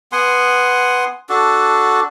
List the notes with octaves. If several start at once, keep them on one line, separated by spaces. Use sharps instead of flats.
B3 F#5 G#5 C6
D4 F#4 A4